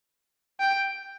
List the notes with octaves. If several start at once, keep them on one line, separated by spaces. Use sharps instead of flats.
G5